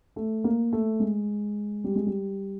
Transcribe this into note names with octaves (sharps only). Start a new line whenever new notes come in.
A3
A#3
A3
G#3
G3
G#3
G3